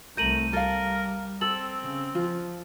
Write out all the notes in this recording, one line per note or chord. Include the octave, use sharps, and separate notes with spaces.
C2 A3 A#4 G6 D#7 F#7
G3 A4 A#4 F5
C4 A4 E6 A6 F#7
C#3
F3 F4